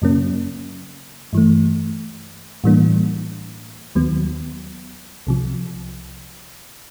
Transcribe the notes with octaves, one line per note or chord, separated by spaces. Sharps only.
F#2 C#3 F#3 A#3 C#4
G2 E3 A3
A2 E3 G3 A#3 D4
D#2 D#3 F#3 B3
C2 C3 F3